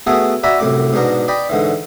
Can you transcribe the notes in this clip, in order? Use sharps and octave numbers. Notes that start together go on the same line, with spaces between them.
A3 B3 F#4 G#4 A4
F#4 D5 E5 G#5 A#5 B5
C2 F#2 A2 D6
G#2 B2 B3 D4 A#5
D5 D#5 G5 B5
G#2 D3 E3